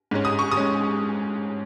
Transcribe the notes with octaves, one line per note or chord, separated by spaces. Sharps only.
G#2 G#3 C#4
D#6
C#6
D#6
G#3 C#4